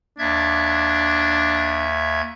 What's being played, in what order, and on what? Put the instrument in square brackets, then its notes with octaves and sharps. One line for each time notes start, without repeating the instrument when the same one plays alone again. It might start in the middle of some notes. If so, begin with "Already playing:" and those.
[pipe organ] D#2 E5 G#6 [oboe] D4